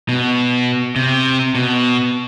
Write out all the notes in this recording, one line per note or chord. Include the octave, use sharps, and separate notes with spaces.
B2
C3
B2